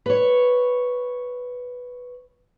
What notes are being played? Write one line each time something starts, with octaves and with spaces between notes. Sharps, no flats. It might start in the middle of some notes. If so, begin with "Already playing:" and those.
B4 C#5